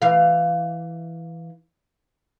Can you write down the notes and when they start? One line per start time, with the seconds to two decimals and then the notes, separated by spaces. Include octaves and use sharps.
0.02 E3 F5